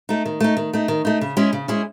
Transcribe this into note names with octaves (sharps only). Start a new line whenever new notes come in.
A3 D#4
D#3
A3 D#4
D#3
A3 D#4
D#3
A3 D#4
C#3
G#3 C#4 E4 G#4
C#3
G#3 C#4 E4 G#4